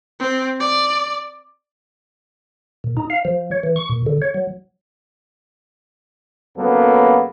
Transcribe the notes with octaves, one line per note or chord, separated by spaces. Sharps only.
C4
D5
A#2
D#4
F5
F3
C#5
E3
C#6
A#2
D3
C#5
F#3
F2 C#3 F#3 A#3 B3 A4